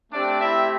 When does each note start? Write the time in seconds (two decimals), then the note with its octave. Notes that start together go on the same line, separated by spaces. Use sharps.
0.11 A3 C4 D4 G4 D5
0.39 E4 E5